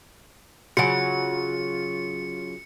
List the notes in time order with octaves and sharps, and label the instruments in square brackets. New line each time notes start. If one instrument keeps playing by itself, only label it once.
[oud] C#3 F#3 [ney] F4 [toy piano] F#4 G#5 [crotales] C#7